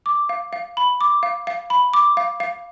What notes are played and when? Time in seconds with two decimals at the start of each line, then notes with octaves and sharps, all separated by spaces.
0.06 D6
0.29 F5
0.53 F5
0.77 B5
1.01 D6
1.23 F5
1.47 F5
1.70 B5
1.94 D6
2.17 F5
2.40 F5